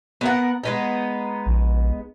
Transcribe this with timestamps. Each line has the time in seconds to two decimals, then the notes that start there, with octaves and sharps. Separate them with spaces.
0.21 B3 A#4 F#5
0.64 G#3 B3 D#4
1.46 A#1